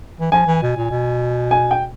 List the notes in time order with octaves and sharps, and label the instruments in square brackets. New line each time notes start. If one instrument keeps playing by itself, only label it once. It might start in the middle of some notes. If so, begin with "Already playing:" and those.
[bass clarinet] E3
[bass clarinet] F3 [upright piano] G#5
[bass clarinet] E3
B2
A#2
B2
[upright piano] G#5
G5